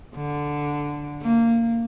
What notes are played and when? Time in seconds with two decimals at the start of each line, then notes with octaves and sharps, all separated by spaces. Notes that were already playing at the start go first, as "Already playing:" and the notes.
0.15 D3
1.22 A#3